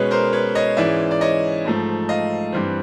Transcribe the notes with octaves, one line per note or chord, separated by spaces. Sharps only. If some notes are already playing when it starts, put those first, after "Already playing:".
Already playing: B2 G#3 C#4 B4 C#5
A#4 C5
B4 C#5
C#5 D#5
G#2 E3 G#3 C#4 D5 E5
D5
C#5 D#5
G#2 F3 A3
D#5 F5
G2 E3 G3 C4